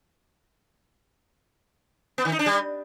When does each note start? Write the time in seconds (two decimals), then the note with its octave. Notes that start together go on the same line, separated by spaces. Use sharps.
2.18 B3
2.25 D#3
2.32 D#4
2.39 D4
2.46 G3